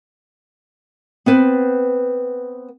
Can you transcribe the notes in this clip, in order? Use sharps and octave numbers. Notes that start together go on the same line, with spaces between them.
B3 C4 B4 C5